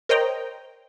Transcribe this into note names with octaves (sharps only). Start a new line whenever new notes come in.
A#4 C5 C#5 D#5 G5 A#5